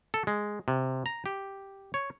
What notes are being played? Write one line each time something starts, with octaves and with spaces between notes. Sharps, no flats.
A4
G#3
C3
A#5
G4
C#5